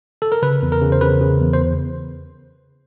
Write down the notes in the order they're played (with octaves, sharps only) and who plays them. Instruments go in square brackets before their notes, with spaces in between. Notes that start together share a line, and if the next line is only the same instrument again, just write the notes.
[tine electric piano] A4
A#4
C#3 B4
E2
A#4
C#3
C5
C#3 B4
C#3
E2
C5